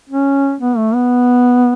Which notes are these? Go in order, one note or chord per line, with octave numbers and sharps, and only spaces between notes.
C#4
B3
A3
B3